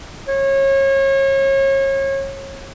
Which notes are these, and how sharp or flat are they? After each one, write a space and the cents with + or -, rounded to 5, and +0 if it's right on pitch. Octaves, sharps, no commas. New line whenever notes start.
C#5 -30